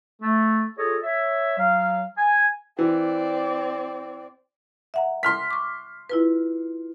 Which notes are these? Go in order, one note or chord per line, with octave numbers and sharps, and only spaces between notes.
A3
F4 G#4 A4 C#5 D#5
C#5 E5
F#3 F5
G#5
E3 C4 D5
E5 F#5 A#5
C6 F6 B6
C#6 D6
E4 F4 B4